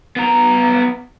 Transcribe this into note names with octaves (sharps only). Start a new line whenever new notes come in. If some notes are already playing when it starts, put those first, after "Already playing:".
B3 A#5